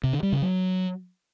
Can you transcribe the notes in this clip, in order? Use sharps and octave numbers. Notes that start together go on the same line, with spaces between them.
C3
D3
G3
C#3
F#3